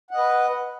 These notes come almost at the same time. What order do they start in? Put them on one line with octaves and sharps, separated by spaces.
F#5 D#5 B4